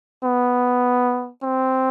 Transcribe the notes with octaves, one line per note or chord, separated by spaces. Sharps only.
B3
C4